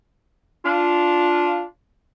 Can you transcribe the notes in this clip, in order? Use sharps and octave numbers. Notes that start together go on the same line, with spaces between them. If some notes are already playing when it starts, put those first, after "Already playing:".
D4 F4